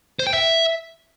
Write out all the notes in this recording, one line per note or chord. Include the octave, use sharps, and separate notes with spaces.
C5
G5
E5